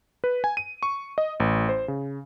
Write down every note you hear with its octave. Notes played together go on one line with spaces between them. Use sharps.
B4
G#5
D#7
C#6
D#5
A1
C5
C#3